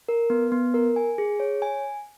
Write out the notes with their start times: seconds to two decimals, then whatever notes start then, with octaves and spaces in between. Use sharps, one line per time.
0.09 A#4
0.30 B3
0.52 B3
0.74 A#4
0.96 G#5
1.18 G#4
1.40 C#5
1.62 G#5